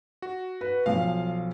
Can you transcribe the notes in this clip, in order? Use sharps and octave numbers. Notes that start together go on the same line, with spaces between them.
F#4
B4
B1 F3 F5